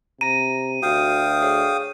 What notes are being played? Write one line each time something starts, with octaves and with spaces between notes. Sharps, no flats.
C3 A#5 A#6 D#7
D2 F#4 F5 G5 D#6
G#4 C#5 C7